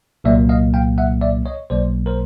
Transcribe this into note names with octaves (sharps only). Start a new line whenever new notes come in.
C2 A#2 F#3 A#3 D5 E5
D#5 F5
F5 G5
E5 F#5
D5 E5
C#5 D#5
B1 B2 F#3 A#3 C5 D5
A#4 C5